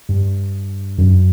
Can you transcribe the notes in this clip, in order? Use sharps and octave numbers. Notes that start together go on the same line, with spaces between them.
G2
F#2